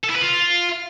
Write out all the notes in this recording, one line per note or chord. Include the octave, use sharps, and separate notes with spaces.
A4
E4
B4
F4